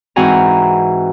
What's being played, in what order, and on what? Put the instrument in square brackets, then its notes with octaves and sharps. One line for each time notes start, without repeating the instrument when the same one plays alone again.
[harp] G#2 E3 C4 F#4 G#5 A#5